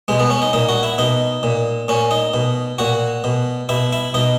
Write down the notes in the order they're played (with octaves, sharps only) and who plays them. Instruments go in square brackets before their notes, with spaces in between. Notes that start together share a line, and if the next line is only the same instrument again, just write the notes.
[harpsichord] B2 G#3
B3
C#4
D#4
A#2 D#4
F#4
E4
B2 D#4
A#2
A#2 C#4
D#4
B2
A#2 F#4
B2
B2 E4
E4
B2 D#4